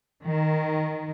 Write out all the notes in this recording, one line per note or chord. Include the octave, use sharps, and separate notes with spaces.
D#3